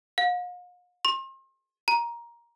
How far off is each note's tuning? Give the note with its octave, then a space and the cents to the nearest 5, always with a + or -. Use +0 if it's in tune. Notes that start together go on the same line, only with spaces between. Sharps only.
F5 +45
C6 +40
A#5 +15